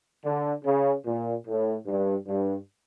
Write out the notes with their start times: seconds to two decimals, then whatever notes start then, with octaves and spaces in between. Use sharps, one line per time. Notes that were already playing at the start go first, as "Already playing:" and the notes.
0.24 D3
0.65 C#3
1.05 A#2
1.47 A2
1.87 G2
2.27 G2